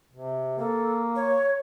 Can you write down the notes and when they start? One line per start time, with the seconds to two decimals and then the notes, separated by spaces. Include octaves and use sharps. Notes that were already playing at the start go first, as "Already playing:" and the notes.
0.13 C3
0.59 A#3 A4
1.16 C#5